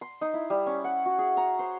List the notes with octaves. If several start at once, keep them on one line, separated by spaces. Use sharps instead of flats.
C6
D#4
E4
G3
C#4
F#5
F#4
G#4
A#5
C5